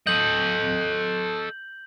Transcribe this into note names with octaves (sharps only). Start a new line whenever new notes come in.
A4 D#5 G6 F#7